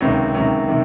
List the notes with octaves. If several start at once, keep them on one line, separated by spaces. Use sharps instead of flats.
C#2 C3 D#3 F#3
C#2 C3 D#3 F#3
C3 D#3 F#3